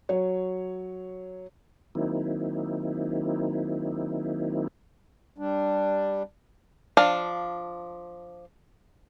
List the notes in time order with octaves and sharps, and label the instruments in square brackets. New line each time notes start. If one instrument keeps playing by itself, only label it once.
[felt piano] F#3 C#5
[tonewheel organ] D#3 F#3 A#3 C4 D#4 E4
[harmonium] G3 D4
[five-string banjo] F3 D4 F5